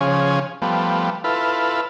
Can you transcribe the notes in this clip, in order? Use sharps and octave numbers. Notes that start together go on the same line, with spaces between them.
C#3 F3 C#4 G#4
F3 G3 A3 B3
E4 F4 A4 B4